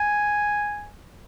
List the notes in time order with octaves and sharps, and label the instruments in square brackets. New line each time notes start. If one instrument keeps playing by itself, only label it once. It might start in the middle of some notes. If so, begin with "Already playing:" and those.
Already playing: [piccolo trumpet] G#5